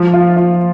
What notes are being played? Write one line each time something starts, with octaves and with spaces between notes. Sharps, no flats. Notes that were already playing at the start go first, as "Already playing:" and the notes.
Already playing: F3
F4
F4